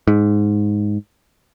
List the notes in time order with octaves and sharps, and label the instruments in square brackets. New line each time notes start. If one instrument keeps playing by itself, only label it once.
[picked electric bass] G#2